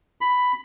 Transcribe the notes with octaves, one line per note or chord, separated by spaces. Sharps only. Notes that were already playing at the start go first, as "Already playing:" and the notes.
B5